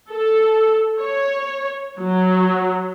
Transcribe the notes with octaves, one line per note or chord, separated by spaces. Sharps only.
A4
C#5
F#3